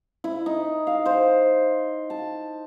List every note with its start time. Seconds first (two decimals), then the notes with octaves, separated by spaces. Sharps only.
0.24 E4
0.46 D#4
0.87 F5
1.06 C5
2.10 A5